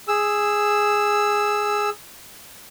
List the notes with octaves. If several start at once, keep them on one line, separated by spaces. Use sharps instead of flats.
G#4 E6